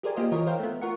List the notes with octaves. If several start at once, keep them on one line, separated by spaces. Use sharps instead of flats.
G4 G#4 A#4 C5 D5 G#5
A#3 F4 G4 C5 D#5
E3 F4 A#4 C#5 D#5
A#4 C5 F5 G5
A3 B3
F4 A#4 F#5 C#6